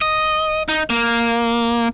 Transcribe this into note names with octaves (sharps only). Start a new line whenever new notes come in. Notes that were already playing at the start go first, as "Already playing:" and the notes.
D#5
D#4
A#3